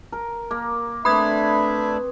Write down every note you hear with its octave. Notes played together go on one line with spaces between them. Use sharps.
A#4
A#3
A3 C4 D4 B4 E5 B5 D#6 G#6